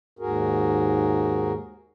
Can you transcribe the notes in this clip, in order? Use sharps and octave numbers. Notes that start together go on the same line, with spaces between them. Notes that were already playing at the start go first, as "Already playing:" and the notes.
D#2 G#2 F#4 G#4 A#4